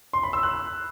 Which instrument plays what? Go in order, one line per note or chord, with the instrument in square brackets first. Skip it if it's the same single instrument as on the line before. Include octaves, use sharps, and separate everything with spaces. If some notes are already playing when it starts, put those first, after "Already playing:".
[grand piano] C6
B5
E6
F#6